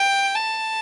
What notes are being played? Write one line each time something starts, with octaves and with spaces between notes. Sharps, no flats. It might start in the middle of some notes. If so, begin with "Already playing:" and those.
Already playing: G5
A5